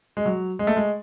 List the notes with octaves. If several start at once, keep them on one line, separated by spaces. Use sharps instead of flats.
G#3
F#3
G#3
A3
G#3